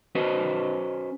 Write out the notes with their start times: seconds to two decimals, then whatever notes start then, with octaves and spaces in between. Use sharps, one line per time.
0.15 C#4 F#4 B4 C5 D#5